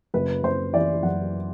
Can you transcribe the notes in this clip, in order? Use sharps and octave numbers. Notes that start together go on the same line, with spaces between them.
F#1 B4
F#1 C5
E3 D5
F#2 F#5